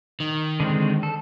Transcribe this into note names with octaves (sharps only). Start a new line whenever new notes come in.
D#3
D3 G#3 C4
A4